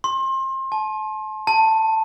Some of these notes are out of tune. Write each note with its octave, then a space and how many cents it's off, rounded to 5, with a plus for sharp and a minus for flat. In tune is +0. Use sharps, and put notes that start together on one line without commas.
C6 +30
A5 -35
A5 +10